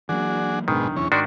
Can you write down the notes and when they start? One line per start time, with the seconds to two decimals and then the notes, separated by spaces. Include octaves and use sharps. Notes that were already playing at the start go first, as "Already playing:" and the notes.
0.09 E3 F#3 A#3 D4 F#4 G#4
0.68 F#1 B1 G#2 B2 D#3 D4
0.96 E2 C#4
1.12 G#2 D#3 D4 F#4 D5 C6